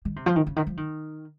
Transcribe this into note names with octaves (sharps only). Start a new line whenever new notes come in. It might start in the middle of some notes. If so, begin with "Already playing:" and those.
D#3
C3
F3
D#3
C#3
D#3
F3
D#3